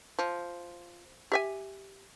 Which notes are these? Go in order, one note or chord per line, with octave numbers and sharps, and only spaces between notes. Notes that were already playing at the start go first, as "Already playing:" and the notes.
F3
G4 E5 G#5